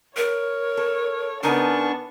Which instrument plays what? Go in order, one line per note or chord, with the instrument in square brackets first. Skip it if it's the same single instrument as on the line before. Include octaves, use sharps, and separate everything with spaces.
[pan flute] A#4 [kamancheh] C#5
[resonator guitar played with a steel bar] A4
[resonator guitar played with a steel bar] C#3 D#4 G#5 [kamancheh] B3 A5 [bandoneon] D4 C#6 [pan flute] A#4